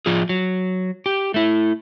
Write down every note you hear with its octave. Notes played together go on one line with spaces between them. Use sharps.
F3 F4 G#4
F#3
G4
A3 E4